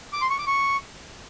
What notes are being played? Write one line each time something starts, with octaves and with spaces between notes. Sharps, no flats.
D6
C6
C#6
D6
C#6